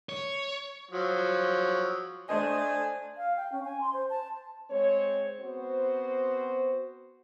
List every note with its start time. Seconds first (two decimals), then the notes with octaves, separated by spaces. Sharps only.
0.09 C#5
0.91 F3 F#3
2.29 A3 D4 C5 D#5 G#5
3.17 F5
3.37 G5
3.52 C#4
3.65 G#5
3.81 C6
3.93 C5
4.10 A5
4.71 G#3 C4 C5 C#5
5.40 B3 C4 F#4 C5